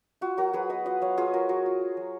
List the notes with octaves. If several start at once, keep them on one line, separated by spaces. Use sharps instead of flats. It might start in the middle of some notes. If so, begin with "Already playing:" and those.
F4 F#4
F#3 F#4 A#4
F#3 G#4 B4
B3 B4 D#5
F4 D#5 F#5
F#3 C#5 F5
F#3 F4 G#4
F4 F#4 A#4
F#3 F#4 A#4
F4
F4
F#3